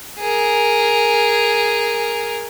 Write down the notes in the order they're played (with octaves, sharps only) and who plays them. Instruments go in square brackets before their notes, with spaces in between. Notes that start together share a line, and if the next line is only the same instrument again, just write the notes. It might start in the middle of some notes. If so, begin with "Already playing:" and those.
[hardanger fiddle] G#4 A#4